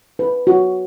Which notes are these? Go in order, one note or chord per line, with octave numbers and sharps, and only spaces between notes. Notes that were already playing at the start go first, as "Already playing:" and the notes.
B4
F#4